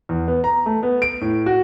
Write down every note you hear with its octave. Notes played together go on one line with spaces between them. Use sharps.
E2
B3
A#5
A3
B3
D7
A2
F#4